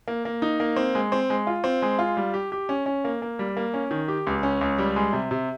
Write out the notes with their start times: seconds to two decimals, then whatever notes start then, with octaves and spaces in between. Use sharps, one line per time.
0.08 A#3
0.25 A#3
0.42 D#4
0.60 A#3
0.76 C4
0.95 G#3
1.12 C4
1.30 G#3
1.47 F4
1.64 C4
1.82 G#3
1.99 F4
2.17 G3
2.34 G4
2.52 G4
2.69 C#4
2.86 C#4
3.05 A#3
3.22 A#3
3.39 G3
3.57 A#3
3.74 C#4
3.91 D#3
4.08 G4
4.27 C#2
4.43 C#4
4.61 C#2
4.78 G3
4.96 G#3
5.13 C3
5.31 C3